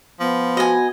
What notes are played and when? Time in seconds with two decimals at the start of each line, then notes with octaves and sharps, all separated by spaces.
0.20 F3 B3
0.57 F#4 D#5 G#5